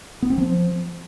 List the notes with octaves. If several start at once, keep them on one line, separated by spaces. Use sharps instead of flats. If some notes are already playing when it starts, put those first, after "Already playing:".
B3
C4
F3